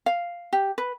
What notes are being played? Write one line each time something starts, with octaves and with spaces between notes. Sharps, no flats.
F5
G4
B4